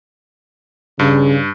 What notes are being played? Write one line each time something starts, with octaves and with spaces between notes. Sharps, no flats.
G2 C#3